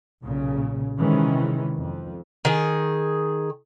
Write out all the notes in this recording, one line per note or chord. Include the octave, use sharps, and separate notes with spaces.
B1 A#2 C#3
C3 D#3 E3 G#3 C#4
F2
D#3 G#4